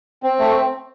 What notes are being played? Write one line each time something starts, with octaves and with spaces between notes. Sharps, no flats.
C4
A3